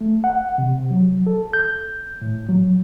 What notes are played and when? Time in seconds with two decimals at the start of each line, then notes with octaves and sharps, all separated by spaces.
0.01 A3
0.24 F#5
0.58 C3
0.90 F#3
1.27 A4
1.53 G6
2.22 A2
2.49 F#3